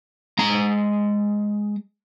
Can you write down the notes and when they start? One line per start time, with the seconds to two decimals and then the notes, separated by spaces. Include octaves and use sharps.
0.39 G#3 A#5